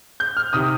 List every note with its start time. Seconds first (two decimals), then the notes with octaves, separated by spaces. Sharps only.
0.20 G6
0.37 F6
0.53 C3 D#3 D#6